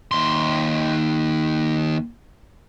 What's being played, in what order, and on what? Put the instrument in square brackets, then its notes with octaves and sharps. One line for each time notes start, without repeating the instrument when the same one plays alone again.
[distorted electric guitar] D#2 C6